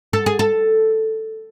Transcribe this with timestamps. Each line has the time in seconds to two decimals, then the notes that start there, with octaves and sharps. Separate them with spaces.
0.13 A4
0.26 G#4
0.39 A4